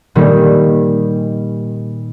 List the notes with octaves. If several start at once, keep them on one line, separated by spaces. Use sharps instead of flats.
A#2 D#3 G3